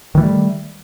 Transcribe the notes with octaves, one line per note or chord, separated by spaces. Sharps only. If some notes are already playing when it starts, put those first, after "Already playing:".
D#3 E3 G3 A3